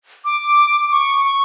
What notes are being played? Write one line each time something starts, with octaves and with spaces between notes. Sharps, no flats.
D6
C#6
C#6